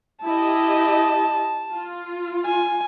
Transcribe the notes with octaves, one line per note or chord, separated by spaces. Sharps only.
E4 G4 D#5 A5
F4
G#5